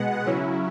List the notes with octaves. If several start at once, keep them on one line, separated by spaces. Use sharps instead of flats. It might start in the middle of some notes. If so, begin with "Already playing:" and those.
Already playing: B2 G#3 B3 F#5
C#3 F#3 C#4 E4